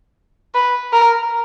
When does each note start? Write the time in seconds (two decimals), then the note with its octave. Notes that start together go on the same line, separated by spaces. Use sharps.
0.54 B4
0.93 A#4